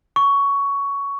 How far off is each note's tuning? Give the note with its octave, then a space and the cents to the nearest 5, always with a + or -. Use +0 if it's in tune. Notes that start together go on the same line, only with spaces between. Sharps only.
C#6 +15